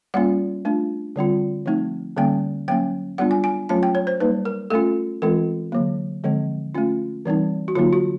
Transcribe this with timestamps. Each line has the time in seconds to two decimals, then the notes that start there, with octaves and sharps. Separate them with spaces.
0.14 G3 A#3 C#4 F4 F#5
0.65 A3 D4 F4
1.16 D3 G3 C4 F4
1.66 F3 A3 C4 D#4
2.17 D3 G3 A#3 C#4 G5
2.68 F#3 A#3 C#4 G5
3.18 G3 B3 D4 F4 F#5
3.31 G#5
3.44 G#5
3.69 F#3 A3 C#4 F4 A5
3.83 G5
3.95 C#5
4.07 C5
4.20 G3 A#3 D#4 B4
4.45 A#4
4.70 A3 C#4 F4 A4
5.22 E3 G#3 C4 F4 A4
5.72 D3 F#3 A#3
6.24 D3 F3 G#3 C4
6.75 A3 C#4 F4
7.25 E3 G3 C4 D#4
7.68 F#4
7.75 D3 F#3 A#3 D#4 F4
7.93 F#4